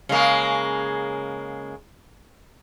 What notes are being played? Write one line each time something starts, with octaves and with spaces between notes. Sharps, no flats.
C#3 G#3 A#3